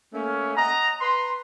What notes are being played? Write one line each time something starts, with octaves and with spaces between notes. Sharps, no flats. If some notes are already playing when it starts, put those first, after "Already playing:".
A3 A#3 C#4
D#5 F#5 A#5
B4 A#5 C6